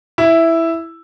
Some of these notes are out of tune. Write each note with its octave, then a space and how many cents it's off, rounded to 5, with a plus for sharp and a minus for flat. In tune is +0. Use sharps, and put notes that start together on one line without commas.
E4 +0